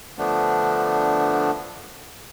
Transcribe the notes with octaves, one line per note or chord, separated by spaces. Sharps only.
D3 F3 A3 B3 D4